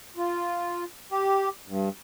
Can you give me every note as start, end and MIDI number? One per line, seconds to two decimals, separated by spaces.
0.17 0.84 65
1.11 1.49 67
1.67 1.89 43